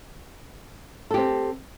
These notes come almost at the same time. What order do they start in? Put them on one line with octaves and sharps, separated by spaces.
A4 G4 C4